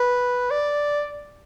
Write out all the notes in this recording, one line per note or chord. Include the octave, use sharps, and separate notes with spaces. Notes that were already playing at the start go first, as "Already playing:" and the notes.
Already playing: B4
D5